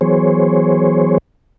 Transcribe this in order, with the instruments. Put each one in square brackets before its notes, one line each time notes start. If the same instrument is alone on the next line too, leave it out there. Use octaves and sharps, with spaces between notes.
[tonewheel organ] E3 F#3 B3 G#4 C5 C#5